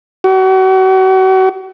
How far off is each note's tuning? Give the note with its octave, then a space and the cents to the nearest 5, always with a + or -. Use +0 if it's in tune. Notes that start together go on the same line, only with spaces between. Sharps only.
F#4 +35